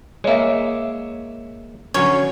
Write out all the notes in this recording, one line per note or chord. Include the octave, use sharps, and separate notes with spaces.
G#3 A#3 C#5 E5
D3 F#3 C#4 C#5